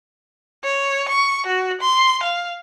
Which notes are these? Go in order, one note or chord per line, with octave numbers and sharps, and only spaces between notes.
C#5
C#6
F#4
C6
F5